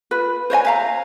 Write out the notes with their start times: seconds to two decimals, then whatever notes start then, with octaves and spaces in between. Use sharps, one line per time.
0.11 F4 B4
0.50 C5 C#5 D#5 G#5
0.65 E5 F5 A#5